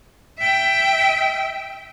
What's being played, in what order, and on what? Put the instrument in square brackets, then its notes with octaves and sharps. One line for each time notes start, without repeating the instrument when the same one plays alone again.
[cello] E5 G5